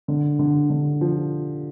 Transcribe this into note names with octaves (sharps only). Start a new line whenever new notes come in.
D3
D3
D3
F3